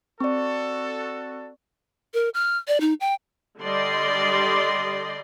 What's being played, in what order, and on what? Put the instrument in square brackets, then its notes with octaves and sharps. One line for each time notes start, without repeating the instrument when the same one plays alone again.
[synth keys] C4 [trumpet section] F#4 A4 [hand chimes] D5 C#6
[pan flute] A#4
F6
D5
D#4
G5
[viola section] D3 G3 D5 D#5 C6